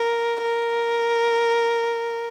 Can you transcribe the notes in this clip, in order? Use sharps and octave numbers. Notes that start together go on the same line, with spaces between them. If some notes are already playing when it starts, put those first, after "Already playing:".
Already playing: A#4
A#4